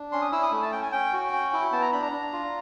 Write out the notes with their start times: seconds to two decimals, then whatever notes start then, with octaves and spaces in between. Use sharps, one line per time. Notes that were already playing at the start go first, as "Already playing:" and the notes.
Already playing: D4
0.12 C#4 C6
0.22 D#6
0.32 E4 E6
0.43 D#6
0.52 A3
0.62 A5
0.72 C#4 G5
0.83 G#5
0.92 C#4 G5
1.13 F#4
1.33 C#4
1.53 E4
1.72 B3 A5
1.82 A#5
1.92 D4 B5
2.02 A#5
2.12 D4
2.33 F4